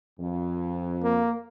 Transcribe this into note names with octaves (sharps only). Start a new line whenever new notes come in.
F2
A#3